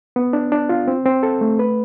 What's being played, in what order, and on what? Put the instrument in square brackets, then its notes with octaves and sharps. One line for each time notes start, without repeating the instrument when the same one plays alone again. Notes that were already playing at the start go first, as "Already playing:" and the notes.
[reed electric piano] B3
D4
D4
F4
C4
C4
A4
A3
B4